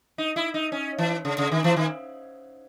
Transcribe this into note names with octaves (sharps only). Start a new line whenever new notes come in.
D#4
E4
D#4
C#4
E3
C#3
C#3
D#3
E3
D#3